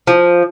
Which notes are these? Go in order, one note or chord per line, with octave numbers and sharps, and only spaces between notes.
F3